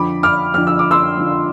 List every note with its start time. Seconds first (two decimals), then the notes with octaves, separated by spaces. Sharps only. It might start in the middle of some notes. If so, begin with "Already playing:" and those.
Already playing: F2 D3 F3 B5 D6
0.23 D6 F6
0.54 F2 D3 F3 F6
0.67 E6
0.79 D6
0.91 C6 E6
1.17 F2 D3 F3